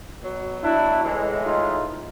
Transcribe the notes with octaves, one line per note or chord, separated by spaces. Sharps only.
B2 F#3
D4 E4
A2 E3 G#3
D#4 F4